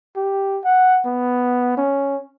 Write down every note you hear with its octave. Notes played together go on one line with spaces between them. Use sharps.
G4
F#5
B3
C#4